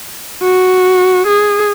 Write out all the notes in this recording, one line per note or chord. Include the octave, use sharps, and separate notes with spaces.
F#4
G#4